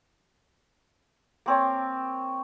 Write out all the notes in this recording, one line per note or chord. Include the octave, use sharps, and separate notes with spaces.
A#3 C4 C#5